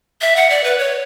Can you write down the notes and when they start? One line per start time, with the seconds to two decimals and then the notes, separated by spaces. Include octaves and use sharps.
0.21 E5
0.36 F#5
0.50 D5
0.64 B4
0.78 C#5